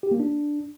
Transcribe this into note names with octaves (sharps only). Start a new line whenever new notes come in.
G4
A#3
D4